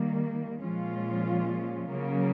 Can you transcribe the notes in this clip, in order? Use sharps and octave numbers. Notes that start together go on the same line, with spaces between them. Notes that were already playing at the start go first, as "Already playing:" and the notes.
Already playing: D#3 G3 A#3
A#2 F3 G#3 C#4 F4
C#3 F#3 A#3